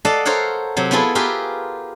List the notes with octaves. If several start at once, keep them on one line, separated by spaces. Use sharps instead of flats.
A4 D5 D#5 F5 F#5 A5
A4 A#4 C5 C#5 F5 F#5
C3 F#3
B3 E4 F4 G#4 A4
F4 G4 G#4 A#4 B4 E5